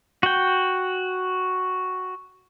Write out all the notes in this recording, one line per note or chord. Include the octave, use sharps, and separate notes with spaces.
F#4 G5